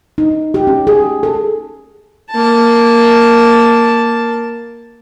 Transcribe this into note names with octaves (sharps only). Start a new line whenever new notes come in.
D#4
G4
C#4
G#4
A4
A#3 A5